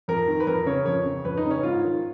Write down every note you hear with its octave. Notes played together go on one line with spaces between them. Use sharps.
F2 A#4
D#3
B4
F2 A#4
C#3 C#5
F2 C#5
C#3
F2 B4
D#4
C#3
C#4
G#2 F4
D#3